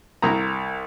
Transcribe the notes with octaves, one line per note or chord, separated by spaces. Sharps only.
C2 A#5